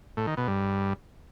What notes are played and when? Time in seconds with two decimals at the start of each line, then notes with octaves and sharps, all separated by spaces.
0.17 A2
0.27 D#3
0.37 B2
0.47 G2